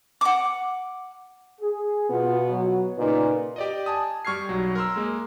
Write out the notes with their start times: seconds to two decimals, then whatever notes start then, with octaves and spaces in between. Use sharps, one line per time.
0.21 F#5 D6
1.61 G#4
2.10 B2 B3 F4
2.49 F#3
2.98 A#2 C#3 D#4 B4
3.56 G4 D5 D#5
3.86 G#5 A5 D#6
4.25 G3 C#6 F6 G#6 C7
4.49 B1 F#3
4.75 A#4 C6 E6
4.96 G#3 A#3